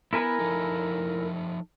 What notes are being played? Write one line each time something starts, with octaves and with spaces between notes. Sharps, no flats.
B3 E4 A#4 G#5
F3 D#4 A4